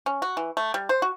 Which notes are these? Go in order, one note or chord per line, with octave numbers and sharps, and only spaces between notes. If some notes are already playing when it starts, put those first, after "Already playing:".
C#4
F#4
E3
A3
G3
C5
F#4